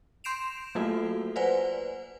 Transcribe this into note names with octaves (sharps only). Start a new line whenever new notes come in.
C6 G6 C7 D7 E7 F7
F#3 A3 A#3 F4 F#4 A4
B4 C5 D5 F#5 G#5